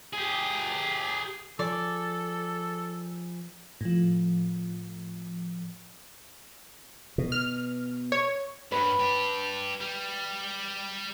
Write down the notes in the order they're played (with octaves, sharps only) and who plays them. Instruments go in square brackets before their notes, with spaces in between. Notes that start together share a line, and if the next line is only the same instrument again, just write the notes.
[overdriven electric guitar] G4 G#4
[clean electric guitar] F3 G#4 [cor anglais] A4 [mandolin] D5
[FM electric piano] A2 F3
[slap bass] B2
[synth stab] F6
C#5
[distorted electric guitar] G2 [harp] B4
[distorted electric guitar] D4 G4
G3